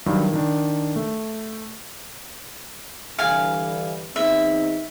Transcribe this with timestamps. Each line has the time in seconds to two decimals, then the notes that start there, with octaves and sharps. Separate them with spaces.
0.06 G2 D#3 F#3
0.33 D#3 D4
0.96 A3
3.19 G2 D3 E3 F5 G#5
4.16 E2 C4 D#4 E5